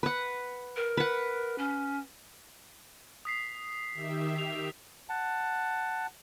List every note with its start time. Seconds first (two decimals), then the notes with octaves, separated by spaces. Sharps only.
0.03 B4 F#5
0.76 A#4
0.97 B4 F#5
1.58 C#4
3.25 D#6 B6 C7
3.93 D#3 G4 E5
4.38 F7
5.09 F#5 A5